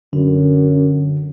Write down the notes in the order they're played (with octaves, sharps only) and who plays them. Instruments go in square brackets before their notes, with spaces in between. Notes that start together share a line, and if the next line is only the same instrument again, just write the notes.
[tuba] F#2 [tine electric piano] D3